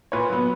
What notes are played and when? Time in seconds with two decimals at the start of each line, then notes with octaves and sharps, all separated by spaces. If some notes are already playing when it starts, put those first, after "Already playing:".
0.12 A#2 B4 C#5
0.30 F#3 B3